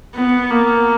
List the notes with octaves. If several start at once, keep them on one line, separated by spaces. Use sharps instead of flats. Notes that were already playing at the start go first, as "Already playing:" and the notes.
B3
A#3